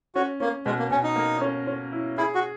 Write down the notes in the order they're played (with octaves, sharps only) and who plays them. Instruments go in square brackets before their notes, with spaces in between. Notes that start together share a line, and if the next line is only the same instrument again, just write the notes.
[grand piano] C#4 [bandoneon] F#4
[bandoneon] A#3 [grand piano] C#4
[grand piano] B2 [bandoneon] G#3
[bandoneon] A#3
[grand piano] B2 [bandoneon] C#4
[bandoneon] D#4
[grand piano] A#3
C#4
C#4
E4
[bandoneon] E4 [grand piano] G#4
[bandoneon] F#4